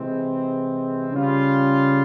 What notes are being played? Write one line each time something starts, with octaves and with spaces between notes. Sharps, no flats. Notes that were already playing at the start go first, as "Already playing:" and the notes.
Already playing: C3 E3 G#3 C4
C#3 G3 C#4 F4